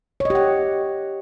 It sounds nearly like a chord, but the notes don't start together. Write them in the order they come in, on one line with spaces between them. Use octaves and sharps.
C#5 D#5 G4 F#5